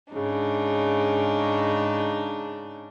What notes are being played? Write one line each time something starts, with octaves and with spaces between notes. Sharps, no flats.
G#2 C#3 D4 D#4